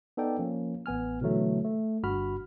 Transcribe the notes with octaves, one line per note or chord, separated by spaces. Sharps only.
B3 D#4 A4 D5 G5
F3 A#3 C#4
A1 B3 G#5 F6
B2 D3 E3 F#3 A3
A3
G1 G2 F#4 B5 F6